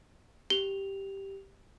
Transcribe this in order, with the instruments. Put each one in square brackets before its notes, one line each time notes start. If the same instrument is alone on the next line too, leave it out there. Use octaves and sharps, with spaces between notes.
[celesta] G4 F7 [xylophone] G7